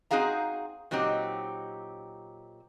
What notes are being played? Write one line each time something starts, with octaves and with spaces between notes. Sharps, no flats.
C4 D#4 F#4 G#4 F5 A#5
A#2 F#3 C4 D#4 G4